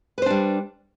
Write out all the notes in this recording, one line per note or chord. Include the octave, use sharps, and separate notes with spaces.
G3 D4 B4 C5